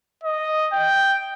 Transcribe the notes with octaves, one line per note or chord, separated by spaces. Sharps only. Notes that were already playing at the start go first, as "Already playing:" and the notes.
D#5
G5